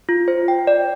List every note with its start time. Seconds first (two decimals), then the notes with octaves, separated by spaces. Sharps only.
0.09 F4
0.28 C5
0.48 G5
0.67 D5